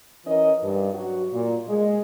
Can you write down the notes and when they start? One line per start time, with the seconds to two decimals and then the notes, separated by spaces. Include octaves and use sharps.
0.25 E3 C#4 A#4 D#5
0.63 G2
0.94 F#3 F#4
1.33 A#2
1.67 G#3